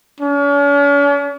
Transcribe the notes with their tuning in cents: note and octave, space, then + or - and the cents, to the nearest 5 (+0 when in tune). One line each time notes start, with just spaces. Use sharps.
C#4 +45